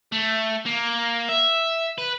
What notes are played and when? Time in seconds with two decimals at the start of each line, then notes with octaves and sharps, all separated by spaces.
0.12 A3
0.65 A#3
1.29 E5
1.98 B4